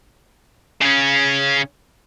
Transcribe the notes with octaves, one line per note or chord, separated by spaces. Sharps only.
C#3 C#4